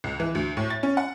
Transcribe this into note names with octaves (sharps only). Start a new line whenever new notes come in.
C#2
E3
D2
A2
A6
C#4
F#5